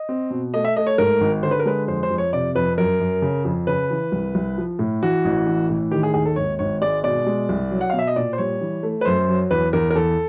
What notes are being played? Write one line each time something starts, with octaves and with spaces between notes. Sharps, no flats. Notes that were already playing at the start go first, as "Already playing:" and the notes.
Already playing: D#5
C4
B2
A3 D#5
E5
A3 D#5
C#5
G#2 A#4
G#1
D3 C5
B4
A#4
G#3 B4
F2 C5
C5
F2
C#5
C3 D5
F2 B4
F#2 A#4
F#2
C#3
F2
C#3 B4
E3
C2
C2
F3
A2
E3 F#4
A1
E3
A2
D#3 G4
G#4
D#2 G#4
A4
G#1 C#5
G#1 C#5
G#3 D5
B2 D5
G#3
C2
F#3
F#5
B2 F5
E5
D#5
A#2 D5
C5
G3 C#5
E3
A3
B4
F#2 C5
F#3
E2 B4
E2 A#4
A#4
E2 A4